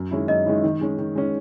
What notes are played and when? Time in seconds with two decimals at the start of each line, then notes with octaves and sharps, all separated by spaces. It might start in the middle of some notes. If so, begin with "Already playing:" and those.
Already playing: F#2
0.11 D#3 G#3 C#4 E4
0.28 F#2 D#5
0.45 D#3 G#3 C#4 E4
0.64 D#3
0.81 G#3 C#4
0.98 D#3
1.16 G#3 C#4